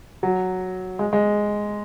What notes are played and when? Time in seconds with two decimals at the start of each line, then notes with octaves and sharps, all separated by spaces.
0.23 F#3
0.99 G#3
1.13 G#3